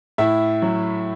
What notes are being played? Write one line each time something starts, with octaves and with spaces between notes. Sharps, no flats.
A2 E4 E5
F#3